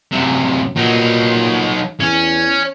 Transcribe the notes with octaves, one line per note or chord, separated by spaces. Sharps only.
F#2 C3
A#2 F#3 D#4
E2 C#4